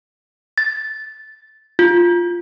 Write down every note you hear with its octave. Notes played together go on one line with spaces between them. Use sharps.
A6
F4